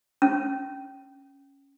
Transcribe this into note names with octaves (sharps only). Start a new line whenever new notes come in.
C#4